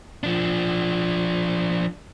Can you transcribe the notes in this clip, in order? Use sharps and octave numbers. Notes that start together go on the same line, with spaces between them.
F3 D4